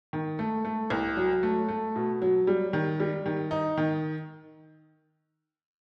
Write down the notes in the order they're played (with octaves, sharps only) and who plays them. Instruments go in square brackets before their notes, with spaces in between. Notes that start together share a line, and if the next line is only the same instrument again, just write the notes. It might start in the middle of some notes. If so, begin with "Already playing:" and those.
[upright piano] D#3
A3
A3
C2
F#3
A3
A3
B2
F#3
G3
D#3
G3
D#3
D#4
D#3